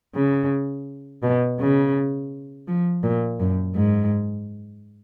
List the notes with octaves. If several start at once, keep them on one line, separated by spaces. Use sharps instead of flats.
C#3
B2
C#3
F3
A#2
F#2
G#2